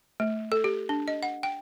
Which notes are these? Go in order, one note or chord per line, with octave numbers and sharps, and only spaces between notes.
A3
A4
G4
D4
D#5
F#5
G5